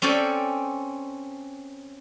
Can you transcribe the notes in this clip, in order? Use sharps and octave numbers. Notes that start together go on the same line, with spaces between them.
C4 C#4 A4 D5 G5 G#5